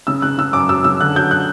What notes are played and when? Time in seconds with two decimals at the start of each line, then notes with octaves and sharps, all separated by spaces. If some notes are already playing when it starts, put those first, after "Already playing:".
0.07 C#3 E6
0.22 C#3 F#6
0.38 C#3 E6
0.53 F#2 D6
0.69 F#3 E6
0.84 C#3 E6
1.00 D3 F#6
1.15 F#3 G6
1.31 F#6